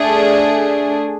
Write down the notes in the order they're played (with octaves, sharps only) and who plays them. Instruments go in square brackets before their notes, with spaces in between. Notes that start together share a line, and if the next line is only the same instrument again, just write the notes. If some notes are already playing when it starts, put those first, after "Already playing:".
Already playing: [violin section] A3 D4 G#4